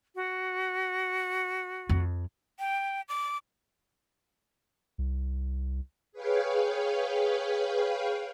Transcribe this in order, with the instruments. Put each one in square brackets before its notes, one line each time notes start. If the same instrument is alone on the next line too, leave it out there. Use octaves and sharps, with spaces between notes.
[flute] F#4
[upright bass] F2
[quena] G5
D6
[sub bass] C2
[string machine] G#4 B4 C#5 F5 G5